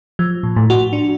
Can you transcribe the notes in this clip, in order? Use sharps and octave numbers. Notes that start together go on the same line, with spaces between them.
F3
A#2
A2
F#4
D4